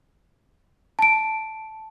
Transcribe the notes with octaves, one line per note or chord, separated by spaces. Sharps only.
A5 D7